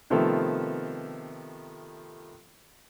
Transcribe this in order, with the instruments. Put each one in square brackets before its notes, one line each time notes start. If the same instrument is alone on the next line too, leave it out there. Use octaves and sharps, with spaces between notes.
[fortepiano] C3 D#3 F3 A3 B3 A4